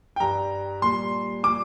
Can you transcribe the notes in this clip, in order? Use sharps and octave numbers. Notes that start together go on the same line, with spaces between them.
G5
G2 G3 A#5
A#2 G3 C6
A#2 G3 D6